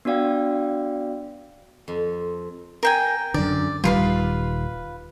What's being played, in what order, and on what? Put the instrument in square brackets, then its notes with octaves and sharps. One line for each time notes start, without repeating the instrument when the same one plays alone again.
[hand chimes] B3 D4 F#4 D5 F5 G5
[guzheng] F2
[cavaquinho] A#4 G5 G#5
[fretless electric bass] F#2 D3 [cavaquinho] D5
[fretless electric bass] D#1 D#3 G3 [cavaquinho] F4 B4 C6